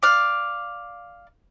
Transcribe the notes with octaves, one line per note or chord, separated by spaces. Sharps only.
D5 F5 F#6